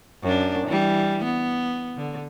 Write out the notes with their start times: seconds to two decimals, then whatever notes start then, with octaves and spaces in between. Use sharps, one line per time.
0.23 F#2 D4
0.67 E3 G3
1.24 B3
1.96 D3